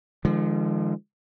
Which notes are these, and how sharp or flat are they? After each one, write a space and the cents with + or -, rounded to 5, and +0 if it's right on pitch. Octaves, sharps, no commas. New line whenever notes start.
D3 +40 F3 -35 G#3 +0